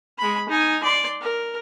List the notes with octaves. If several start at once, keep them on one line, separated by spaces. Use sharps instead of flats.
G#3 B5
D#4 G#5
D5 C6
A#4